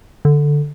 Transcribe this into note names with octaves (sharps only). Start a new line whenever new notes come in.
D3